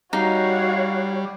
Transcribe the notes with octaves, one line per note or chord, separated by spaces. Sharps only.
G3 D#4 F#4 C#5 F5